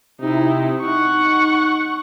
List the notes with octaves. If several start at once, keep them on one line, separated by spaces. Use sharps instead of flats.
C3 D#4 E4
D#4 F#5 C#6